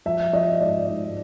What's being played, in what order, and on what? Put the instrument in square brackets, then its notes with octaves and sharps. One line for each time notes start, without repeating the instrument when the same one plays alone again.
[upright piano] F3 E5
F3 D#5
G#2 D5
G#2